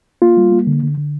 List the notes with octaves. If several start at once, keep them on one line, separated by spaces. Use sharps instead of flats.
A#3 F4
G3
A#3
D3
D3
D3